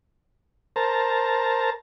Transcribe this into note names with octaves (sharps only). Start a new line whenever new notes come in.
A#4 C5 A5 A#5